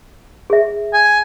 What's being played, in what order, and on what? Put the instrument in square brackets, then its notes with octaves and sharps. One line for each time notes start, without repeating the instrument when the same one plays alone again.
[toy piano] G#4 E5
[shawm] G#5